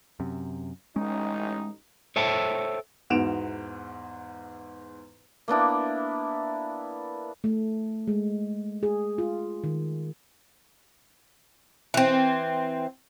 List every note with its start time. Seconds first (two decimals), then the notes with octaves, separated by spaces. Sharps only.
0.20 F#2 C3
0.96 A1 G#3 C#4 D#4
2.16 A4 C5 C#5 E5 G5 A5
3.10 E2 G#2 F#4 D7 E7 F7
5.48 A#3 B3 D4 E4
7.44 A3
8.08 G#3
8.83 G#4
9.18 F4
9.64 D#3
11.94 E3 C4